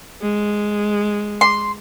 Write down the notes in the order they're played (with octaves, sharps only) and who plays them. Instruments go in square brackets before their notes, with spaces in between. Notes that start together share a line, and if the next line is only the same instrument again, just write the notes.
[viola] G#3
[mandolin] C6